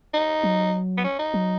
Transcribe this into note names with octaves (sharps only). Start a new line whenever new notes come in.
D#4
F#3
B3
C#4
D#4
F#3